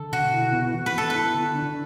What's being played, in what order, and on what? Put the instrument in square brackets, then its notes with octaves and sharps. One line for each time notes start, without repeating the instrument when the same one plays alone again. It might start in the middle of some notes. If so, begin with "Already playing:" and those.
Already playing: [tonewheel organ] D3 [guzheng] A4
[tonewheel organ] B2 [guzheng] F#4
[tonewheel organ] E4
B3
E3
[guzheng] B4
[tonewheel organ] B3 [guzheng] A4
[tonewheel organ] E4 [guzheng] B4
[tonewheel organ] D3
D4